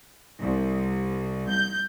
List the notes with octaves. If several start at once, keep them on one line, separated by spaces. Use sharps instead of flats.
C2
G6